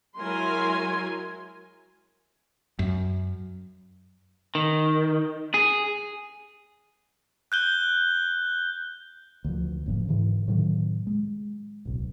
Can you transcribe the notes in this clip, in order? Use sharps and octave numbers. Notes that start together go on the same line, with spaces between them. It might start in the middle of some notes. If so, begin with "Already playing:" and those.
F#3 G#3 E4 A#4 G#5 C6
F#2
D#3
G#4
F#6 G6 G7
D2 F3
F1 A2 C3 F3
G#2 D3 E3
A2 C3 D#3 F#3
G#3
D1 B1